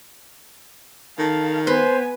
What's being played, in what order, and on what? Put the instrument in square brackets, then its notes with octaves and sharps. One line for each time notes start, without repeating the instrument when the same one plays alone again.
[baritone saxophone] D#3 [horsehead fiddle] A4 F5
[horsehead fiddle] B3 G#5 [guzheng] B4 C6 [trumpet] C5